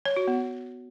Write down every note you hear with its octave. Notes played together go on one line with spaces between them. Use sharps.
C#5
F#4
B3